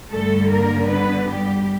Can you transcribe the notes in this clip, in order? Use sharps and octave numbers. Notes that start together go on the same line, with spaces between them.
G2 D3 G3 A3 A4
A#3 A#4
B3 B4
G3 G4